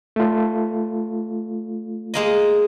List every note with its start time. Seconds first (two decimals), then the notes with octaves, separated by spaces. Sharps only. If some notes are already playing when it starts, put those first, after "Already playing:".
0.16 A3 F4
2.14 G#3 A#3 D#5